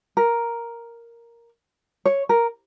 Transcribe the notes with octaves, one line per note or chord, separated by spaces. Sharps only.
A#4
C#5
A#4